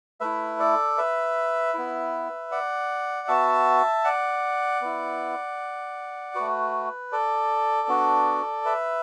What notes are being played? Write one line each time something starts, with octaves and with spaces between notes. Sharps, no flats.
A3 E4 B4 E5
A4 D5
B4 E5
B3 E4
D5 F#5
B3 F#4 E5 A5
D5 F#5
B3 E4
A3 F#4 B4
A4 D5
B3 D4 F#4
B4 E5